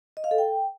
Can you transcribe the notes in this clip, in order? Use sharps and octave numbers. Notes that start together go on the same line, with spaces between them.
D#5
F5
A4
G5